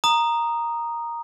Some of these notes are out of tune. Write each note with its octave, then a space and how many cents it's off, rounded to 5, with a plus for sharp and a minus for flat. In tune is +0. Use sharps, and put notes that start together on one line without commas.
A#5 +0 D#6 -10